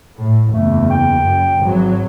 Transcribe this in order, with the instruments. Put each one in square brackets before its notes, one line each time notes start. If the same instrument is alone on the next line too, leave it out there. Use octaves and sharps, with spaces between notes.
[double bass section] A2
[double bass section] F#1 E2 [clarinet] A3
[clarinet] G5
[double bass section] F#2
G#1 F#3